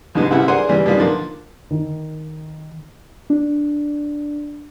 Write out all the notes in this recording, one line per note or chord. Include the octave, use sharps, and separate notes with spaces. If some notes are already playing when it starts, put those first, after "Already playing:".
C2 F2 G#2 D3 G#3 B3
C2 C#3 E4 F#5
D4 G#4 A#4 C5 F#5 G#5
C#2 E3 G3
B2 D#3 G3 F4
D3 D#3 F3 A#3
D#3
D4